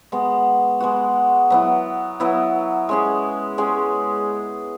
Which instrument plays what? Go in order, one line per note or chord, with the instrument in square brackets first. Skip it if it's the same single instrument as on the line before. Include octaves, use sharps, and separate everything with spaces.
[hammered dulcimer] G#3 B3 F#4
G#3 B3 F#4
F#3 B3 E4
F#3 B3 E4
G#3 C#4 G#4
G#3 C#4 G#4